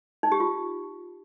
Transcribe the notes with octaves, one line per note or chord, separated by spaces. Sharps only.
D#4
G4
F4